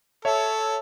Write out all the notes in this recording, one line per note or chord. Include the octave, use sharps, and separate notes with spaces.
A4 C#5 E5